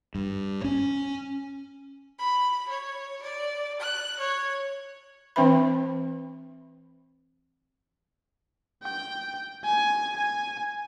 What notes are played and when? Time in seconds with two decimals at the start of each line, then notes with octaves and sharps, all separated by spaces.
0.15 G2
0.64 C#4
2.19 B5
2.69 C#5
3.22 D5
3.80 F#6
4.19 C#5
5.36 E3 C4 D4 B4 E5 B5
8.83 G5
9.64 G#5
10.17 G#5